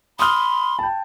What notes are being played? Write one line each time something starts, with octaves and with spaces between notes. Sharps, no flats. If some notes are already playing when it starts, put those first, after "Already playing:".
B5 C6 D#6 F6
G5 A5